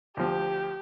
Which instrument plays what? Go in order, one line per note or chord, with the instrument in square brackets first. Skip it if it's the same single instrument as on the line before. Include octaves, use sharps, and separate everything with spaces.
[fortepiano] D2 F3 [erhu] G4